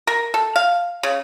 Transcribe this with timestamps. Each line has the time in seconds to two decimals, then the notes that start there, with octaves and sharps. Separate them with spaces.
0.07 A#4
0.34 A4
0.56 F5
1.03 C#3